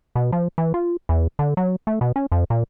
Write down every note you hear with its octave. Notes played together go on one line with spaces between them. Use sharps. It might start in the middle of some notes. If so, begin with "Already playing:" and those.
B2
F3
E3
F4
E2
D3
F#3
A3
B2
C#4
F2
A#2